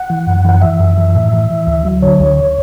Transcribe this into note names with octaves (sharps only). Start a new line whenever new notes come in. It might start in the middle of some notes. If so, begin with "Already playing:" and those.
Already playing: F#5
E3
F#2
E3 F#5
E3 E5
F#2
E3
A2
E3
E3
D2
F#3
D3 C#5
D2